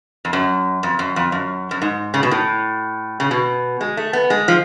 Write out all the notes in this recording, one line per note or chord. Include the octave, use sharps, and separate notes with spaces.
F2
F#2
F2
F#2
F2
F#2
F#2
G#2
C#3
B2
A2
C#3
B2
G#3
A3
B3
G#3
F3